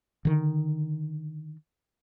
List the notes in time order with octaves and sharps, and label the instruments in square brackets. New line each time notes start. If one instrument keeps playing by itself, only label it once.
[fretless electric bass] D3 D#3